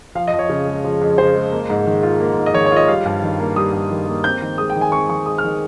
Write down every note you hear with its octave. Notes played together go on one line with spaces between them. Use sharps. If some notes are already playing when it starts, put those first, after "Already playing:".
F3 F5
D#5
F2
C#5
C#3
G#3
F3
F2
C#3 C5
G#3
A#3
G#2
D#3
F4
A#3
G#2
D#5
D#3 C#5
C#5
F4 D#5
G3 F5
G2
D#3
A#3
G3 D#6
G2
D#3
A#3
C4 G6
D#3
G#3 D#6
G5
D#3
G#5
C4 C#6
D#3 C#6
G#3 D#6
F6
D#3